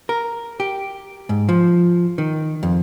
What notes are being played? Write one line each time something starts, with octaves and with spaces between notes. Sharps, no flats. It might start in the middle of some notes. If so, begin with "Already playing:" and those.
A#4
G4
G#2
F3
D#3
F2